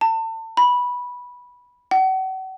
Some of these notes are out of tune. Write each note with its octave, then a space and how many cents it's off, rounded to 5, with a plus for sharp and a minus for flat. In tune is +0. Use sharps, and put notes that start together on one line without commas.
A5 +35
B5 -10
F#5 +40